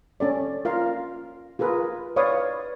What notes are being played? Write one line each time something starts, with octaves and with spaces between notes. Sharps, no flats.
C#4 A4 D5
F4 A#4 F5
F4 G#4 A#4 B4
B4 C#5 D5 F5 C#6 D#6